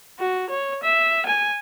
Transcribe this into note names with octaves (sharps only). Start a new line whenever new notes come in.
F#4
C#5
E5
G#5